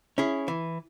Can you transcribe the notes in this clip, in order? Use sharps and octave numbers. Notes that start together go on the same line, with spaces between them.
C#4 E4 G#4
E3